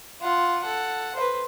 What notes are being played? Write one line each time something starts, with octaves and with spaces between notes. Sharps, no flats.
F4 F#5
A4 F#5
B4 C5